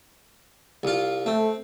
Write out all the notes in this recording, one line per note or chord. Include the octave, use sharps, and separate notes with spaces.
C2 F4
A3 C4